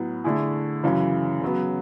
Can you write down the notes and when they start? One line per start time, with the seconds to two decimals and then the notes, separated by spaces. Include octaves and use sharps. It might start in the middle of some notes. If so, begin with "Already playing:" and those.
Already playing: A2 F#3 B3
0.24 D3 A3 E4 G#4
0.84 F#2 C#3 E3
1.42 C#3 F#3 B3